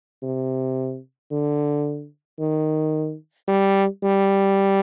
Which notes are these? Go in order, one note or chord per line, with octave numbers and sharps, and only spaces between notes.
C3
D3
D#3
G3
G3